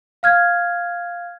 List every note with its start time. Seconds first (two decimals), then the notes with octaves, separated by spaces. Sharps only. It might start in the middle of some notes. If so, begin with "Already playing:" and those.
0.23 F5 F6 G#6